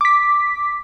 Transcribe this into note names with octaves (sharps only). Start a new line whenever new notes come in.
D6 B6